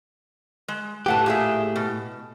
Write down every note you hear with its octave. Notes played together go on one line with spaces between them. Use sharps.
G#3
A2 A3 G4 B4 F#5 A5
A#2 G#4 E5
B2